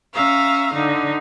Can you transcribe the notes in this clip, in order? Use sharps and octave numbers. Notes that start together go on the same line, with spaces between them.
C#4 E5 F5 A#5
D3 D#4